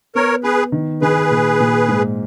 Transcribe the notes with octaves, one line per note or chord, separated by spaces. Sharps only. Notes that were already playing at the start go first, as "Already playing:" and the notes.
B3 A#4 C#5
B3 G#4 B4
D#3
D#3 G#4 B4
A#2
A#2
G#2